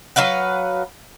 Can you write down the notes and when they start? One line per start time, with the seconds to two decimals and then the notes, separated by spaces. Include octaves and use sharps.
0.16 F#3 B4 F5 F#5